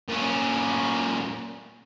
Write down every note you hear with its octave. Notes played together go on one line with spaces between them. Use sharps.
A#2 C#4